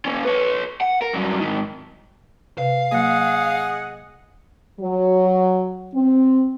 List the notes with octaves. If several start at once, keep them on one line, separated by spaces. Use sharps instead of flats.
A#3 C#4
B4 C#5
F#5
A#4
G2 F#3
G#2 D#3
C3 B4 F5
F#3 A#3 G#4 D#5 F#5
F#3
C4